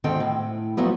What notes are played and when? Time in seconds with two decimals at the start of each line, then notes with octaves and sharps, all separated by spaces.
0.04 D2 G#2 D#3 C4 A4 G5
0.20 A2
0.77 F3 F#3 A3 B3